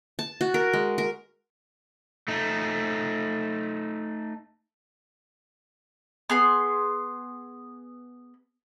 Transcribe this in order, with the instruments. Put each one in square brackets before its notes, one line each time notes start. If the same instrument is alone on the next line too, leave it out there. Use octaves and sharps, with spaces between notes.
[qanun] A5
F#4
A#4
G#3
A#4
[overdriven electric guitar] A3 D#4
[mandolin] B3 G#4 C6